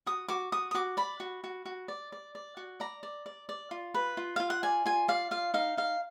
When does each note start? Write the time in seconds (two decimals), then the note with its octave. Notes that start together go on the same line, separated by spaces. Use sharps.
0.06 F#4 D#6
0.28 F#4 D6
0.52 F#4 D#6
0.71 D#6
0.75 F#4 D6
0.97 D5 B5
1.20 F#4
1.44 F#4
1.65 F#4
1.88 D5
2.12 D5
2.35 D5
2.57 F#4
2.80 D5 A#5
3.03 D5
3.26 D5
3.49 D5
3.71 F4
3.94 B4
4.17 F4
4.36 F4 F5
4.50 F#5
4.63 D5 G#5
4.86 F4 G#5
5.08 D5 F5
5.31 F4 F5
5.54 D#4 F5
5.77 D#4 F5